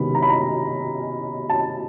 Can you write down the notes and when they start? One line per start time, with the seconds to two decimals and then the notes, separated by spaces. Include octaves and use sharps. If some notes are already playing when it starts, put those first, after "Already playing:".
Already playing: C3 D#3 G#3 B3 B5
0.15 A#5
0.23 B5
0.30 A#5
1.50 A5